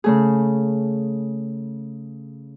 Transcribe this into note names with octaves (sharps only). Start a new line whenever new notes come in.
C#3 A3 G#4